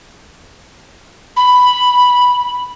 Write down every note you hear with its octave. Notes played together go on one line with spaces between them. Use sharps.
B5